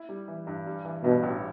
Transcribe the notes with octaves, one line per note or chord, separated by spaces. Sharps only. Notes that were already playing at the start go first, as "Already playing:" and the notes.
Already playing: E4
G3
E3
G2
G3
E3
G2 B2
A1